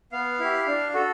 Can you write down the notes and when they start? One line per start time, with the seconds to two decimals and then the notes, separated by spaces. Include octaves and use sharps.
0.12 B3 F5
0.40 E4 G4
0.67 D4
0.94 F#4 A4